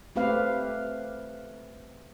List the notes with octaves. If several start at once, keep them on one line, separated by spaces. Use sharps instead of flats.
A3 C4 G4 B4 F5